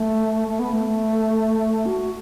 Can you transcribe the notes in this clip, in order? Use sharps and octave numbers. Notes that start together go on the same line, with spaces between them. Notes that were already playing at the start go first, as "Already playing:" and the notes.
Already playing: A3
A3
B3
A3
F#4